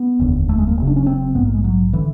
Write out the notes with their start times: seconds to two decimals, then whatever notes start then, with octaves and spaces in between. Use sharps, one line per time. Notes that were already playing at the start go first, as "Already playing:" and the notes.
Already playing: B3
0.19 F1 D#2 D3
0.49 A3
0.58 G#3
0.67 A#3
0.77 F#1 F#2 C#3
0.87 D4
0.96 C#4
1.06 C4
1.35 A#1 G#2 B3
1.45 A#3
1.54 G#3
1.64 F#3
1.93 D3 E3